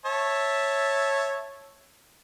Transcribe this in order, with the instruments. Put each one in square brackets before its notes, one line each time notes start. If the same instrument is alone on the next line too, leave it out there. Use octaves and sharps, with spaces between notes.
[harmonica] C#5 E5 A5